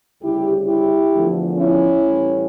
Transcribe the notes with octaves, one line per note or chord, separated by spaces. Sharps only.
D2 C#3 G3 E4 G4
E4 G4
E2 D3 F3 A3
C#4 E4
A2 E3 G3